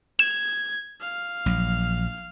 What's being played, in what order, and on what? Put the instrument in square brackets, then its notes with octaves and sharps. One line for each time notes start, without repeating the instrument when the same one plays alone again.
[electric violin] G#6 [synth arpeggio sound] E7
[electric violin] F5
[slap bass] A#1 F#3